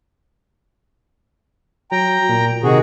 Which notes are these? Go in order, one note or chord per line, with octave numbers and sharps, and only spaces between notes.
F#3 G5 A#5
A#2
C3 D#3 F#4 G#4